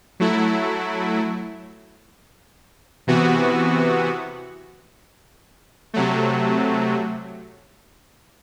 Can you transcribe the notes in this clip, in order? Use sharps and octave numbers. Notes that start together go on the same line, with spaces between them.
F#3 A3 E4
C3 E3 B3 F#4
C3 F#3 A3